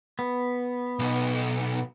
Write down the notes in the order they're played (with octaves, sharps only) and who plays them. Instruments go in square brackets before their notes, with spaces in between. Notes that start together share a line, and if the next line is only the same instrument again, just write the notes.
[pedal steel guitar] B3
[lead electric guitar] B1 B2